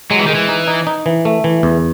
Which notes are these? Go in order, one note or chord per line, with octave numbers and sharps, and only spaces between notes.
F#3 G#3
E3
D#3
G#3
E3
D#4
D#4
D#4
E3
A3
E3
E2